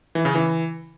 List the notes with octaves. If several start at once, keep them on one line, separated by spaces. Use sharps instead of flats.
E3
C#3
E3